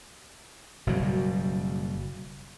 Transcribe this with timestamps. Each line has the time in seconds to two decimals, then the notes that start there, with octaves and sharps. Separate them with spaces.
0.87 F#1 B2 F#3 G3